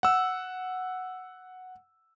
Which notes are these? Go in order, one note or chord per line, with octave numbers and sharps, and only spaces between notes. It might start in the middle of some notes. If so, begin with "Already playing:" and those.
F#5 E6